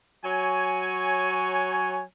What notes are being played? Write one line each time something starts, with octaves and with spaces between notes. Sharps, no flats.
F#3 C#5 G#5